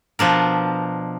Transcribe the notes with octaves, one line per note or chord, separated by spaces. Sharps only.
B2 F3 D4 A#4